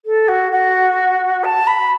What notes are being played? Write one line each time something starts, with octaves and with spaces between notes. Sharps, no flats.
A4
F#4
F#4
A5
B5